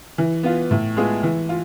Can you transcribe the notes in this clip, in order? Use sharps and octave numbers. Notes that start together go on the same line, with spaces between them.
E3
B3 F4
A2
G#3 B3 F4 G#4
E3
F4